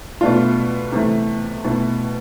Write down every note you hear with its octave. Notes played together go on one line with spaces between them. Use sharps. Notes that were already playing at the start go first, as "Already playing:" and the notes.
B2 A3 D4 F4
C3 E3 A3
B2 A3 E4